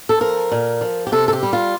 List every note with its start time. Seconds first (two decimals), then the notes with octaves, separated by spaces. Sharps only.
0.09 A4
0.21 F3 A#4
0.52 A#2
0.81 F3
1.07 G4
1.12 C3 A4
1.28 A4
1.33 G4
1.43 G3
1.53 F4